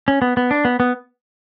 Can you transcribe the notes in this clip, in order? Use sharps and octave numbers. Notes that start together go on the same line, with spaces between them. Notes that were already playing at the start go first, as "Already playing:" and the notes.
C#4
B3
B3
D4
B3
B3